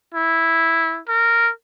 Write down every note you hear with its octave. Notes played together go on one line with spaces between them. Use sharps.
E4
A#4